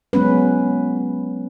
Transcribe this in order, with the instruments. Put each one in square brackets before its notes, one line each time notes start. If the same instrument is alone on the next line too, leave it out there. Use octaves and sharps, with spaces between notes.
[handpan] F#3 G#3 B3 C#4 B4